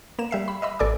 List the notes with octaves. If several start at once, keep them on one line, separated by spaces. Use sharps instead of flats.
A#3 E7
G3 E5 C7
B5
D#5 E5 B5
A1 A4 D5 G#5 D6